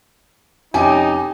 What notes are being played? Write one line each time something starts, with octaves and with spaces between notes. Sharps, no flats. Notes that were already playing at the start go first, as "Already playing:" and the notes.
F2 C3 C#4 D#4 G4 G#5